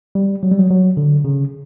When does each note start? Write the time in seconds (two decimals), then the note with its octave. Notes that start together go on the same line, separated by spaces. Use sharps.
0.15 G3
0.43 F#3
0.52 G3
0.59 F#3
0.70 F#3
0.97 D3
1.25 C#3